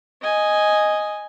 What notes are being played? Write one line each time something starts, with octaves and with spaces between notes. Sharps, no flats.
D#5 G#5